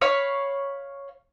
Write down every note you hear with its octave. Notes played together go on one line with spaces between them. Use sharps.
C#5 F5 B5